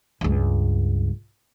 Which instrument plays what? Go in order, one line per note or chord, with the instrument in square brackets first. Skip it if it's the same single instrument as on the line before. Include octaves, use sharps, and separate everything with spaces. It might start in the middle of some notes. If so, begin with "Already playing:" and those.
[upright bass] C#2 G2